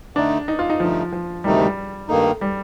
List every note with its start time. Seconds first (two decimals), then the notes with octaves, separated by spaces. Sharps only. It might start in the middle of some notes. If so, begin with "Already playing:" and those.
0.16 D3 A3 D4 D#4
0.48 D#4
0.59 F4
0.70 D#4
0.80 G2 D3 F3 A3 D#4
1.12 F3
1.44 D2 C3 D#3 G3 A3 D#4
1.61 G3
2.08 G2 D#3 A3 A#3 D#4
2.41 G3